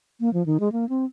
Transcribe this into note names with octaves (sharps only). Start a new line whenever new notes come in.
A#3
F3
D#3
G#3
A#3
C4